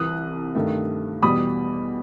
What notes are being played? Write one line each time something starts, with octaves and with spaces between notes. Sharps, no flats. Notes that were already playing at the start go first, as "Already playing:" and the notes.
Already playing: C2 C3 E3 D#6 F#6
G2 D#3 A3
E2 B2 G3 B5 D#6